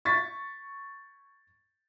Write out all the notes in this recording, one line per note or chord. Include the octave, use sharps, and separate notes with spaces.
C#6 A6 B6